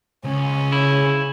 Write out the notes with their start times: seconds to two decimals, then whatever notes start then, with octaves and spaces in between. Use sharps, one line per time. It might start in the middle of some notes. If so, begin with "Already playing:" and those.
0.24 C#2 C#4
0.72 C#3 E4